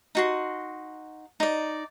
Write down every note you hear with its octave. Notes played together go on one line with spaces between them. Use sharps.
D#4 F#4 C6
D#4 D5